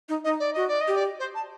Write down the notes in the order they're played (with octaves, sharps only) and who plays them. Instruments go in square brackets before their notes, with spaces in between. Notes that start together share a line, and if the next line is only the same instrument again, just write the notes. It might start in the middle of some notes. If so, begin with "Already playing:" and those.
[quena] D#4
[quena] D#4 [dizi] D#5
[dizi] D5
[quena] F#4 [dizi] D#5
[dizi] D5
D#5
[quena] G4
[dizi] D5
C5
A5